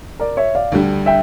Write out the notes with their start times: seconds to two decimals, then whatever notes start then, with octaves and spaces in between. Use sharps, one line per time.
0.20 A#4 D5
0.37 C#5 E5
0.55 D5 F5
0.72 D2 D3 G3
1.06 E5 G5